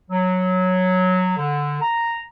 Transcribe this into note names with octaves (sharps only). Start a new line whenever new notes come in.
F#3
D3
A#5